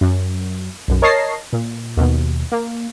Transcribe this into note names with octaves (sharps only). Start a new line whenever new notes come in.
F#2
B1 F#2
A#4 C#5 D#5 A5 A#6 C7
A#2
D#2 B2
A#3